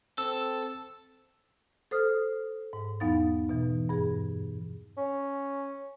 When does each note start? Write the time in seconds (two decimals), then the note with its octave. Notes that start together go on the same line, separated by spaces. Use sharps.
0.18 C4 A4 E6
1.91 A4 C5 D#6 F6
2.73 G#2
3.00 E2 F#3 B3 D#4 F5 A6
3.49 B2 E3
3.89 G2 G#4
4.97 C#4